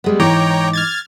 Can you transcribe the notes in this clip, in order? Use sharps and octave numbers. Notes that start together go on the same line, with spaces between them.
G3 G#3 B3
G#2 E3 D#4 C#5 G5 A#5 D6
F6 G#6 A6